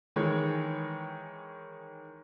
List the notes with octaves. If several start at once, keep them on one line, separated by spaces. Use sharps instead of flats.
D#3 E3 G#3 C#5